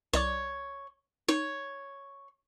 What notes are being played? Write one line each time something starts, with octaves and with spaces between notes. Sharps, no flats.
C2 C#5 D5 D6
D#4 C#5